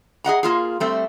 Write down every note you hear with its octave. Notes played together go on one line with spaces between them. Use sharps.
G#4 D#5 F#5 A#5
A#3 F4 G#4
G3 A3 C4